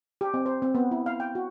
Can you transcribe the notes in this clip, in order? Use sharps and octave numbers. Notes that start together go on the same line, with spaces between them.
G4
C4
C5
C4
B3
E4
F5
G5
F#4